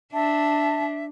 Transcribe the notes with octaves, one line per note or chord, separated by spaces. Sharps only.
D4 E5 A5